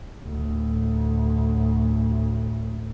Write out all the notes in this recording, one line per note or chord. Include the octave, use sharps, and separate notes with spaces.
D2 A2